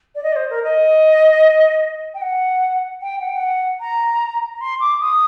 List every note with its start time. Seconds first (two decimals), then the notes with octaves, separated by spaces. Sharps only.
0.15 D5
0.23 D#5
0.32 D5
0.36 C5
0.50 A#4
0.63 D#5
2.14 G5
2.21 F#5
3.02 G5
3.20 F#5
3.29 G5
3.37 F#5
3.80 A#5
4.54 A#5
4.61 C6
4.80 D6
5.00 D#6